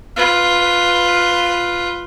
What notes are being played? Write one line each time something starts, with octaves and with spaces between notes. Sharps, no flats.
F4 B4